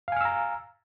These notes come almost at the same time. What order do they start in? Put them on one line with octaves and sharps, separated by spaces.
F5 G#5 F6 E6 A#5